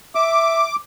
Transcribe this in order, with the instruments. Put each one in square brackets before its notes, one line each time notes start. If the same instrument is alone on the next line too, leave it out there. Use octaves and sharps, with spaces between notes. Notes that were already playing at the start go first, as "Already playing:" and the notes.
[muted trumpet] E5 [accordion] D6